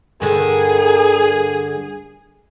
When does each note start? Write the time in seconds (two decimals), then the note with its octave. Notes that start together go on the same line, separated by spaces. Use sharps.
0.22 G2 D3 G#4 A#4